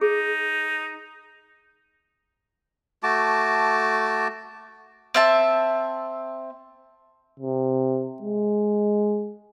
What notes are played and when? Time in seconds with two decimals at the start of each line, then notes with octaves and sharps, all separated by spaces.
0.01 D#4 G#4
3.03 A3 F#4 A5 D6
5.14 C4 E5 A5
7.40 C3
8.22 G#3